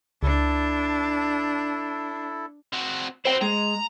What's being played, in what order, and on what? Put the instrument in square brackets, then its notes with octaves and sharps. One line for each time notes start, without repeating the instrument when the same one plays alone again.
[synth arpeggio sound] C#2 [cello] D4 [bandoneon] E4 A4
[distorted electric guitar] C4 F#4
[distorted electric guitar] E4 F#4 [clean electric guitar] C5 G5
[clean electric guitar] G#3 [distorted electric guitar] A#5